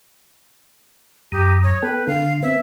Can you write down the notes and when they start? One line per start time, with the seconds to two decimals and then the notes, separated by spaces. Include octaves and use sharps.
1.32 F#2 G4 A#5 D#6
1.63 C#5
1.82 B3 A4 B4 G5
2.07 D3 F5
2.43 B3 C4 E5